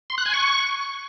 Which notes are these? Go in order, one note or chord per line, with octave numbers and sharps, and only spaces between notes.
C6
F#6
G#5
C#6